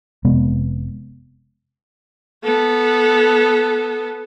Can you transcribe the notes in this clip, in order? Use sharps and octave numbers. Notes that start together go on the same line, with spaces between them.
F1 C3 G#3 B3
B3 A4